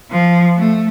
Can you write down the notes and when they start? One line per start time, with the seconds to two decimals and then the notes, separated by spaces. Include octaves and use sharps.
0.11 F3
0.57 A3